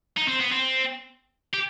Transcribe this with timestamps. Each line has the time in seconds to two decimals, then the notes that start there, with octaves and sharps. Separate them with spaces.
0.17 D#4
0.28 C4
0.41 B3
0.52 C4
1.54 G4